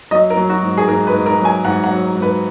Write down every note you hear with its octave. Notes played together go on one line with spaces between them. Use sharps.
F#3 D#5
A#4
F#3
F#4
G#2
G#4
G#2 A#4
B4
G#2
A#4
F#3
G#5
G#2 F#5
F#5
F#3
G#2
B4